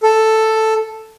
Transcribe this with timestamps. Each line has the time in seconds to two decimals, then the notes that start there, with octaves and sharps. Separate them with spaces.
0.03 A4